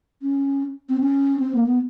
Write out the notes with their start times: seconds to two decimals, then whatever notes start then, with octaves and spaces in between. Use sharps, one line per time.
0.22 C#4
0.89 C4
1.00 C#4
1.39 C4
1.55 A#3
1.67 B3